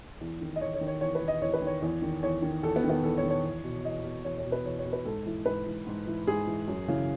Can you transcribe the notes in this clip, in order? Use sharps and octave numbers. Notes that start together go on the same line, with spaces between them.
E2
D#3
D#5
E2 C#5
C#5
D#3
C#5
E2 C#5
B4
D#3
D#5
E2 C#5
B4
D#3 C#5
E2
D#3
E2 C#5
D#3
E2 A4
B3
D#3
B3
E2 A4
C#5
D#3
C#5
E2
B2
E2 D#5
B2
E2 C#5
C#5
B2
B4
E2 C#5
C#5
B2
B4
G#2 A4
E3
G#2 B4
E3
G#2
E3
G#2 G#4
E3
F#2
C#3 E3